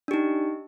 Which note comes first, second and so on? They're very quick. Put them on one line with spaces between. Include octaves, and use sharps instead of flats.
D4 G4 D#4